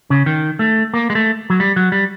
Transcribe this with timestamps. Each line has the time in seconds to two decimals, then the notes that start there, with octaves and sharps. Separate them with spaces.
0.10 C#3
0.26 D#3
0.59 A3
0.94 A#3
1.10 G#3
1.15 A3
1.50 F#3
1.60 G3
1.76 F#3
1.92 G3